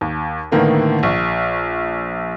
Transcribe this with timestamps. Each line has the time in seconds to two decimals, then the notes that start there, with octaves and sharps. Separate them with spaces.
0.01 D#2
0.52 A2 D3 D#3 A#3 B3
1.03 A#1 C#6